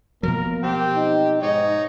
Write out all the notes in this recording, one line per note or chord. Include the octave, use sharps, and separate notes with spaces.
B2 F3 F#3 A#3 A#4
C4 G4
D#4
G#2 D#4 C#5